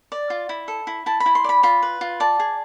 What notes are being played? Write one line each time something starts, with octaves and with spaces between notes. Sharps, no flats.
D5
F4
E4
A4
E4
E4 A5
B5
E4
C6
D5 B5
F4 B5
B4
F4
D5 A5
G#4